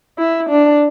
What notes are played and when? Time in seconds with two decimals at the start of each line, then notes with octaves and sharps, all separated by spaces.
0.19 E4
0.49 D4